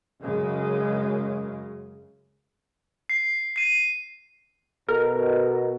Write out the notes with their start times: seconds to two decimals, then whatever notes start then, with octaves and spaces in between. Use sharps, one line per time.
0.22 F#2 C#3 G#3
3.10 C7
3.56 C7 D#7
4.88 B2 A4 A#4